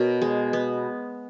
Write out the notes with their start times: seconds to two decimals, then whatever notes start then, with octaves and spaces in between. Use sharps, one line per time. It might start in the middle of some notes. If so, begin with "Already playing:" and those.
Already playing: B2 A#4 C#5
0.22 G#3
0.53 B3